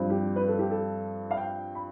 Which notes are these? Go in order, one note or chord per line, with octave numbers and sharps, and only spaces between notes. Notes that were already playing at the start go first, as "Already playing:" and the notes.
Already playing: G2 F3 C4
G4
B4
A4
G4
A4
F5
G5
B5